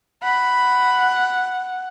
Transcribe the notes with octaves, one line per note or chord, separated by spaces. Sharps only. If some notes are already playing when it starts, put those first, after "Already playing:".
F#5 B5